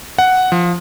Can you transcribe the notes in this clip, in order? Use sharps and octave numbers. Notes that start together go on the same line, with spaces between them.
F#5
F3